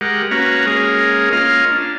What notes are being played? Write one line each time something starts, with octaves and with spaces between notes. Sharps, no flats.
G#3 G4 A#4 F#5
A#3 C#4 F#4 B4 A#5
G#3 A#3 C#4 G#4 A#4
A#3 C#4 F4 D#5 F6
D4